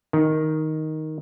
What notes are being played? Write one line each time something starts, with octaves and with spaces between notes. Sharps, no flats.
D#3